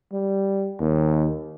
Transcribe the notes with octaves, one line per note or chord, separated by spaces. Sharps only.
G3
D#2